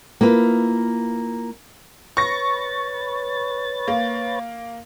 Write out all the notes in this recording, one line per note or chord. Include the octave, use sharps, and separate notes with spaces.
A#3 E4 F4 B4
B4 C#5 C#6 A6 A#6
A#3